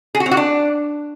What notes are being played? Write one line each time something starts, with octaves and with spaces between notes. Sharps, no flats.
G#4
F#4
C4
F#4
D4